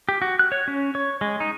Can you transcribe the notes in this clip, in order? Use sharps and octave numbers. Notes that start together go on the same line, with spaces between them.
G4
F#4
F#6
C#5
C#4
C#5
G#3
D#4